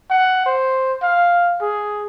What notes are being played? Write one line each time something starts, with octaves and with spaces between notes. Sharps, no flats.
F#5
C5
F5
G#4